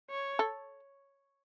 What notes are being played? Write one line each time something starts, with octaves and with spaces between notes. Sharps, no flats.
C#5
A4